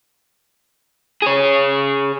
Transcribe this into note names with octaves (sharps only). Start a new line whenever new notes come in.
G#4 C#5